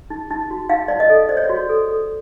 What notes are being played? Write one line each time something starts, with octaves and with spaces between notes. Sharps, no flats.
D#4
D#4
F#4
D#4 F5
D#4 D5
D#5
A4
C5 D5
C#5
D5
F#4
A4
A4